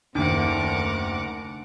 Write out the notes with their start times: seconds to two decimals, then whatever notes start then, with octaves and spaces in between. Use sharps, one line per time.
0.15 F#1 D#2 D3 A3 D4 A#4 F#5 D6